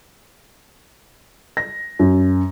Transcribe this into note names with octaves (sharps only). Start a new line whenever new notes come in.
A#6
F#2